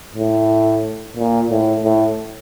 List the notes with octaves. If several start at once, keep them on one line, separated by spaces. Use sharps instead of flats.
A2
A#2
A2
A2